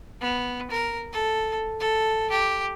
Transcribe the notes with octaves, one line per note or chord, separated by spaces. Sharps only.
B3
A#4
A4
A4
G4